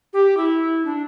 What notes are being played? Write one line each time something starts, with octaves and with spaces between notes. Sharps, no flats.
G4
E4
D4